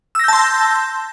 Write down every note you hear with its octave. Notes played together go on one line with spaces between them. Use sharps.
A5 C6 E6 G6 A#6